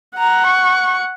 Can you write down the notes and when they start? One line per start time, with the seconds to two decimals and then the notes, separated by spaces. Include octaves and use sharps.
0.18 F#5 A#5
0.47 C#6